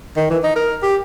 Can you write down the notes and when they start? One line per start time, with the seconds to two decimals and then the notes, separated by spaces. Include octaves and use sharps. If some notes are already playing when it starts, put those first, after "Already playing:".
0.16 D#3
0.30 E3
0.43 D#4
0.56 A#4
0.82 G4